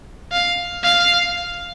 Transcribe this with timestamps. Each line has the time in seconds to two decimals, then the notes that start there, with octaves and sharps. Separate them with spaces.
0.32 F5
0.83 F5